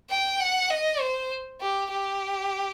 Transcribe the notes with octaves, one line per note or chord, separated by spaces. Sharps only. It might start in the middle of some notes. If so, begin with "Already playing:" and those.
G5
F#5
D#5
C5
G4
G4